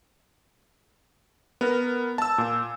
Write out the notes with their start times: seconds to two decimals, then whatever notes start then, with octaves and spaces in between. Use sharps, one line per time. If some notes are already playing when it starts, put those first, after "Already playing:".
1.61 B3 A#4
2.18 A5 E6
2.38 A#2